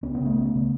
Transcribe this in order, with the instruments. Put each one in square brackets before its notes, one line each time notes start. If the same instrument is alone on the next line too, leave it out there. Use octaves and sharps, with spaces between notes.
[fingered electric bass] C#2 B3 C#4
B3 C#4
C#3
A3 B3
C#2
C#3